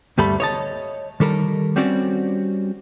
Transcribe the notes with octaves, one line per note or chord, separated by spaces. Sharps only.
D2 G2 G3 A3 A4 B5
C#5 D#5 A5
D#3 G3 A4 A#4
G3 C4 C#4 F#4 D5